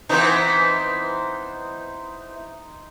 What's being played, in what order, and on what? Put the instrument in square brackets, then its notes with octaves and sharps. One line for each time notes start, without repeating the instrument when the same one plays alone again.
[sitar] E3 B3 C4 [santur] D#4 C5